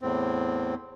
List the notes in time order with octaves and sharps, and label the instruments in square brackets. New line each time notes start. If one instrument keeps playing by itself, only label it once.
[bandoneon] E2 A2 C4